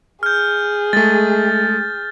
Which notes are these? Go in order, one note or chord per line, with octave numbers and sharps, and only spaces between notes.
G#4 F6 G6
G#3 A3 A6